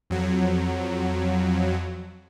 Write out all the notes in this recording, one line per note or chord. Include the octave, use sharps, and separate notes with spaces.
F2 F#3